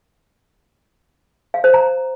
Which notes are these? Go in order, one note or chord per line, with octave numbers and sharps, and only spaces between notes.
F5
C5
A#5